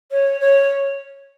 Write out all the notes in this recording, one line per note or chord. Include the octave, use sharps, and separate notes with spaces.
C#5
C#5